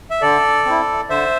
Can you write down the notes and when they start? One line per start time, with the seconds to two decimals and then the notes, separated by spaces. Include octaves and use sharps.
0.11 E5
0.22 D3 A4 D5
0.66 C4 E4
1.10 D3 C5 E5